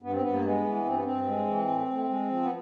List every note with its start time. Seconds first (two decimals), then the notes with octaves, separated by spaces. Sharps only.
0.02 G2 B3
0.12 C4
0.21 G2 B3
0.33 A#3
0.44 G#3 B3
0.64 E3
0.85 G2 C4
0.94 B3
1.04 G2 C4
1.26 G#3
1.46 E3
1.68 A2
1.88 A2
2.09 G#3
2.30 F3
2.42 B3